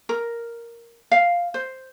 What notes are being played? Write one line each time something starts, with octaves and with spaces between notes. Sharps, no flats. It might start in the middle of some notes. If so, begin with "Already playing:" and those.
A#4
F5
C5